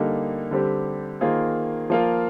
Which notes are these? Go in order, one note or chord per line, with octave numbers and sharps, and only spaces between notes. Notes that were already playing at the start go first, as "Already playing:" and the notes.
Already playing: D3 G3 A#3 D#4
D3 G3 C4 G4
D#3 A#3 F4 G#4 C5
F3 A#3 F4